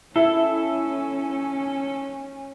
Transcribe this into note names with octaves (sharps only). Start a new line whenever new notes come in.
C#4 E4 A4